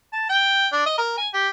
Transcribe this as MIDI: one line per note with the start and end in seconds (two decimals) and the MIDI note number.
0.13 0.25 81
0.29 0.67 79
0.73 0.83 62
0.86 0.97 75
0.98 1.13 70
1.18 1.28 80
1.34 1.49 67